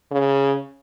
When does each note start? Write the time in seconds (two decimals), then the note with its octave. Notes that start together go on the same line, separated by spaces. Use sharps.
0.11 C#3